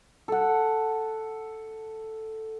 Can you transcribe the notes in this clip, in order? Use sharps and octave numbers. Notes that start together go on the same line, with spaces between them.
A4 F#5